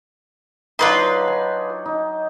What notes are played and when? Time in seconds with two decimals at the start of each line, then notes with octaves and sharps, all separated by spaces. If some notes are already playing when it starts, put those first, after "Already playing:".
0.79 F#3 D4 D#4 F4 B4 C6
1.28 G#5
1.86 D#4